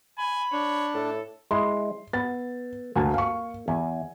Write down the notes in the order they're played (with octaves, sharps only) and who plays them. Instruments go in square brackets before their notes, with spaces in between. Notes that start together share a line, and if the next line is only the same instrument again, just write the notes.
[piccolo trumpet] G#5 [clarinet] B5
[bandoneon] D4 [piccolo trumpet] C#5
[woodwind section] A2 [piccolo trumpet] A4
[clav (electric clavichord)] G#3 E4 [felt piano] C6
[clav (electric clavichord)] B3 [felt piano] A6
[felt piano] D2 [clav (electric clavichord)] A#3 G#5 A5
[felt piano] F5 C#6
[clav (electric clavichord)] E2 [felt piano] G#5